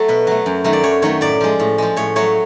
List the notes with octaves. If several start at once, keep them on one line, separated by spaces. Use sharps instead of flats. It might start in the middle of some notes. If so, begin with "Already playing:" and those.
Already playing: F#3 A3 A4
B2 B4
F#3 A3
F#2
D#3 F#3 A3
D5
F#2 C#5
D#3 F#3 A3 C#5
A2 D5
F3 G#3
A2
F3 G#3
A2 C#5
F#3 A3 C#5